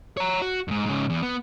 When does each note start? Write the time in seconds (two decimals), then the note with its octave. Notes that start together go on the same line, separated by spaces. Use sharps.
0.17 C#5 A#5
0.42 F#4
0.68 F2 G#2
0.86 G#2 C#3
1.10 E2
1.22 B3